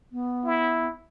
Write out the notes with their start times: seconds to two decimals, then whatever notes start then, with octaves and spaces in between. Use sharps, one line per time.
0.12 B3
0.45 E4